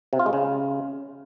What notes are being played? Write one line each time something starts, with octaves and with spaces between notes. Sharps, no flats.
C3
F4
G#3
C#3